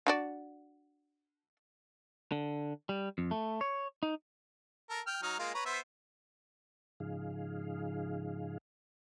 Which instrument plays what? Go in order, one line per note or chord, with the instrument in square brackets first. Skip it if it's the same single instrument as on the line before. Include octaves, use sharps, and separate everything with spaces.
[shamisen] D4 F#4 D5
[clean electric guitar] D3
G3
F2
A3
C#5
D#4
[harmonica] A4 A#4
G5 F6
F#3 D#4 F6
G#3 A#3 F4
B4 C#5 A#5
B3 C5 E5
[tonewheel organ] G#2 C#3 F3 D#4 G#4 F5